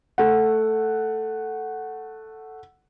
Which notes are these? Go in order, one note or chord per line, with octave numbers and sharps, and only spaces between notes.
A3 F#5